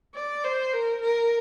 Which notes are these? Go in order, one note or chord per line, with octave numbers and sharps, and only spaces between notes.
D5
C5
A#4
A#4